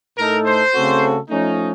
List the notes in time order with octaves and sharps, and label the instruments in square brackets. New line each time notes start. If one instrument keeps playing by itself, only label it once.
[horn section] A2 A3 D#4 A4 [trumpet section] A#4
[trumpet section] C5
[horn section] C#3 A3 C4 F#4 A4
[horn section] F3 A3 C#4 [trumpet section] D#4